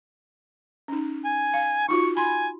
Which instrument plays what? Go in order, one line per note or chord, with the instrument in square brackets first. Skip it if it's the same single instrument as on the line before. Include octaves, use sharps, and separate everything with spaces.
[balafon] C#4 D#4
[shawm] G#5
[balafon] F5
[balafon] D#4 F4 F#4 [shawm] C#6
[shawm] G#5 [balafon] B5 C6